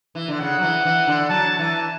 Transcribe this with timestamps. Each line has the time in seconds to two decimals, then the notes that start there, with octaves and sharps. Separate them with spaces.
0.15 E3
0.28 D3
0.40 C#3 F#5
0.58 F#3
0.63 E3
0.85 E3
1.07 D3
1.29 F#3 A5
1.59 E3 A5